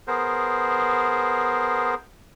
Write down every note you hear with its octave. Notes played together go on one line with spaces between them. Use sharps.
B3 G#4 A#4 C5